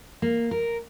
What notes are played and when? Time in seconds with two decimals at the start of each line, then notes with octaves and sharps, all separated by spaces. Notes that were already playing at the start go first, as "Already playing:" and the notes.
0.22 A#3
0.51 A#4